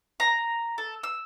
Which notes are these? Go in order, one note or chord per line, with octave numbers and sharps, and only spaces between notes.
A#5
A4
E6